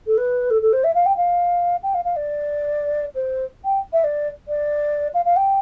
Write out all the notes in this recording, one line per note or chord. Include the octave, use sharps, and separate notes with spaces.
A4
B4
A4
A4
C5
E5
F5
G5
F5
G5
F5
F5
D5
C5
G5
E5
D5
D5
F5
F5
G5